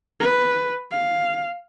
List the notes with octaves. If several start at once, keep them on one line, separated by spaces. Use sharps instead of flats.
B4
F5